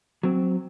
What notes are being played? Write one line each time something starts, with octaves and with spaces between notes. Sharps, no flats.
F#3 C4